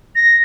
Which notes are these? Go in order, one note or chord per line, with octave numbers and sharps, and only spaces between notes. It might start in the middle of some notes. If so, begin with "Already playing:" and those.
A#6